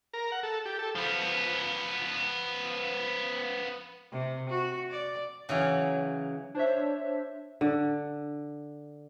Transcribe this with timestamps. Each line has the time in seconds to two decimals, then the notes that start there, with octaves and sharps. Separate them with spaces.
0.13 A#4
0.32 F#5
0.43 A4
0.66 G4
0.79 A4
0.95 F3 B3
4.12 C3
4.50 F#4
4.91 D5
5.49 C#3 E3 F#3
6.55 D4 C5 C#5 E5
7.61 D3